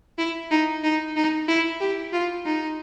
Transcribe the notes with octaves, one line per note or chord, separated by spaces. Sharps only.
E4
D#4
D#4
D#4
E4
G4
F4
D#4